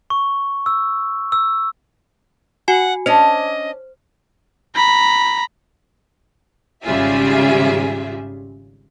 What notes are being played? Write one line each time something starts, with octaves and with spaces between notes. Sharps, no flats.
C#6
E6
E6
F#4 F#5 G#5
C#4 D4 C5 D#5
A#5 B5
G#1 C#3 G3 F4 G#4 E5